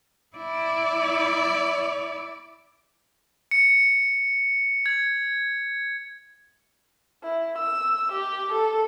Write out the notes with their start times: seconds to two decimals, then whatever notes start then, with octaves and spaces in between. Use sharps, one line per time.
0.37 E4 D5
3.51 C#7
4.86 G#6
7.23 E4
7.58 E6
8.13 G4
8.53 A4